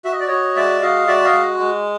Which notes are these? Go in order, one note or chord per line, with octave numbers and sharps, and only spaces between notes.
F#4 E5
D#5
D5
F#4 C#5 D#5
G#3 D5 E5
F#4 D#5 F5
F#4 D5 E5
D#5 F5
G#3
G#3